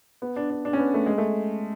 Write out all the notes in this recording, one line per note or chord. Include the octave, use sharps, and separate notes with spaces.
B3
D4
D4
D4
C#4
B3
A3
G#3
A3